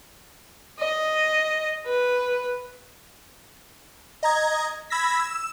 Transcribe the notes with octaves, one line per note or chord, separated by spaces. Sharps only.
D#5
B4
D#5 A#5 G#6
B5 E6 G#6 A#6 B6
E6